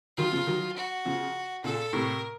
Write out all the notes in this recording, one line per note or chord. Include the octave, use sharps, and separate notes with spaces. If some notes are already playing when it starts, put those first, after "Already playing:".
D#3 F#3 F4
C#3 F3
D#3 F#3
F#4
C#3 F3
A#2 C#3 A4
A2 C3 A#4